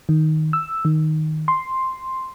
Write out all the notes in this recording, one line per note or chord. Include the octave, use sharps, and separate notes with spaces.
D#3
E6
D#3
C6